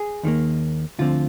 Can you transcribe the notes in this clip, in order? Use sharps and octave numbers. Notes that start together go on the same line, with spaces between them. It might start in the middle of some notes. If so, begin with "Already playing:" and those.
Already playing: G#4
D#2 D#3 G3 A#3
D2 D3 F3 C4 F4